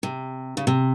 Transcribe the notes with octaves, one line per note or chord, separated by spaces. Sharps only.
C3
C#3
C3